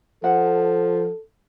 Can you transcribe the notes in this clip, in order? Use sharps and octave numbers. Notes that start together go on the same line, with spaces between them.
F3 A4 F#5